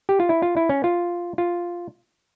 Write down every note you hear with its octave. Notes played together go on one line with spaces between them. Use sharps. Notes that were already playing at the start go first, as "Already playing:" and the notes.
G4
F4
E4
F4
E4
C#4
F4
F4